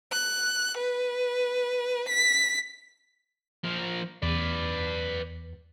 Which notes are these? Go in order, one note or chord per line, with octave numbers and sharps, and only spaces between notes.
F#6
B4
B6
F3 A#4
E2 B4 D5